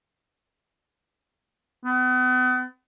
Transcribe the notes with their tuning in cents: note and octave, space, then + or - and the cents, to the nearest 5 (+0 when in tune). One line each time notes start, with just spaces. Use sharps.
B3 +40